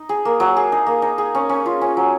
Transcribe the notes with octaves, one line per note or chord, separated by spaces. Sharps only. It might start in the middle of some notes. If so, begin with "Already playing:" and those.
Already playing: D#4
G#4
A#3
F#3
G#4
D#4
A#3
D#4
G#4
C#4
C#4
F4
C#4
F#3